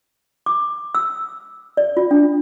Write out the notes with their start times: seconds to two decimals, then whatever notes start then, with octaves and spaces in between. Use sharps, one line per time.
0.46 D6
0.95 E6
1.77 D5
1.97 F4
2.11 D4